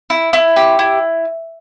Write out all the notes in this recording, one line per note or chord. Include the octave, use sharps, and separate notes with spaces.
E4
E4
G4
E4